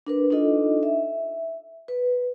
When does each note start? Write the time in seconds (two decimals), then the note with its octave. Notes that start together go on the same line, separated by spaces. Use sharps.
0.07 D4 A#4 B4
0.30 D4 D#4 F4 A4 D#5
0.83 E5
1.88 B4